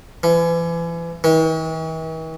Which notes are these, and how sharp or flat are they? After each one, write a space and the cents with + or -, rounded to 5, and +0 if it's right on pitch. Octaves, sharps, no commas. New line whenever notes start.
E3 +35
E3 -45